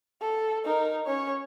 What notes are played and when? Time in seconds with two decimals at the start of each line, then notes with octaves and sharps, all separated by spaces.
0.21 A4
0.64 D#4 A#4
1.06 C#4 C#5